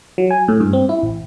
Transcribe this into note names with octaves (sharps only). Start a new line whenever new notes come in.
F#3
G#5
A2
G2
C4
E4
A1